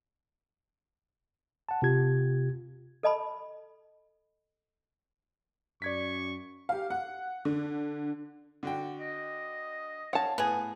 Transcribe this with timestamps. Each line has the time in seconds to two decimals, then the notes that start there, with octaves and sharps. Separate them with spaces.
1.69 F#5 A5
1.82 C3 F4 G4 G#6
3.03 A4 D#5 A5 B5
5.82 F#2 D5 C#6 G#6 B6
6.69 G4 F5
6.90 F#5
7.45 D3
8.63 D3 F#4 G5
9.00 D#5
10.13 C#5 F5 F#5 A5
10.38 A2 B3 G#4